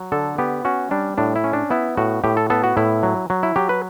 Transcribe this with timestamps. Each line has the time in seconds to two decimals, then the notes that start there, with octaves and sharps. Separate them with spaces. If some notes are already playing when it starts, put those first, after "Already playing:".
Already playing: F#3
0.12 D3 A4
0.38 B3 G4
0.65 C#4 F#4
0.91 G3 D4
1.18 A2 D4
1.36 E4
1.44 C#4
1.53 D4
1.70 B3 E4
1.97 A2 F#4
2.24 A2 G4
2.37 A4
2.50 B3 A4
2.64 F#4
2.77 A2 E4
3.03 F#3
3.30 F#3
3.43 E4
3.56 F#3 G4
3.69 B4